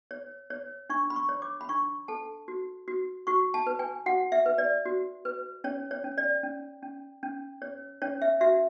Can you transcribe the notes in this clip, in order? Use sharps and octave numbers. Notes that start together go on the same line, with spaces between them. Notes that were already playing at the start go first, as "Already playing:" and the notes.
C#5
C#5
D4 C#6
B5
C#6
C#5
D6
B5
D4 C#6
A4 A5
F#4
F#4
F#4 C#6
A5
B4
G#5
F#4 F#5
E5
B4
D5
F#4
B4
C#4 C#5
C#5
C#4
D5
C#4
C#4
C#4
C#5
C#4 C#5
E5
F#4 E5